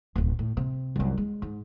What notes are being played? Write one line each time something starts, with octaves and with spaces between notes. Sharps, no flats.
D1 B1
A2
C3
C2 F#2
G#3
G#2